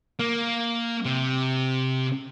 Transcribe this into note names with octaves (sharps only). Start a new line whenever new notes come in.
A#3
C3